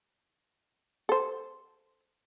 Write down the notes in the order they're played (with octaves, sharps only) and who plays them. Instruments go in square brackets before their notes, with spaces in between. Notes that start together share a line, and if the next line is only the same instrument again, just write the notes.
[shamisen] A4 C5